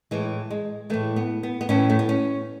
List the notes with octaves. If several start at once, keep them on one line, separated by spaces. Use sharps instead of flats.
A2 E3 G#3
G#3
A2 E3 A3
B3
B3
B3
A2 E3 C#4
A3
B3
C#4